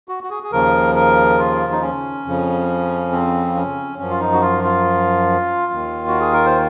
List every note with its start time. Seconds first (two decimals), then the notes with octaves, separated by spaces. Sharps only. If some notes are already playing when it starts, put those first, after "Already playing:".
0.09 F#4
0.24 F#4
0.30 G#4
0.43 G#4
0.52 D#2 C#3 F3 A#4
0.95 A#4
1.38 F4
1.72 D#4
1.82 C#4
2.25 F2 C#3 F3
3.12 C4
3.55 C#4
3.99 F#2 F3 C#4
4.10 F4
4.20 D#4
4.33 F#4
4.42 F4
4.64 F4
5.72 D#2 D#3
6.07 F#4
6.20 G#4
6.33 A#4
6.46 C5